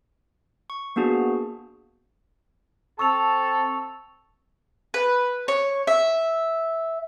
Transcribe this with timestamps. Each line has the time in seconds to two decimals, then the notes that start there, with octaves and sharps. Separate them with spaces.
0.70 C#6
0.96 A#3 B3 D4 F#4 G#4
2.99 C4 A4 A5 C#6 E6 F7
4.94 B4
5.48 C#5
5.87 E5